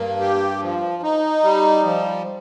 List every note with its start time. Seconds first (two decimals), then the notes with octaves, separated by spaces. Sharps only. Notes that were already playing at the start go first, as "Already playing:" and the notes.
Already playing: G2 A#3
0.20 G4
0.61 F3
1.03 D#4
1.43 G3
1.84 F3